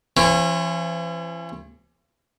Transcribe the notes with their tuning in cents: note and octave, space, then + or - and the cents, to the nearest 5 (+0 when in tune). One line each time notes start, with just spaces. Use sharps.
E3 +45 C#4 -30